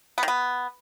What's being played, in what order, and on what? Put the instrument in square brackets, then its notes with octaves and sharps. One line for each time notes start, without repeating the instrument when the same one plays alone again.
[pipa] B3
D#3
B3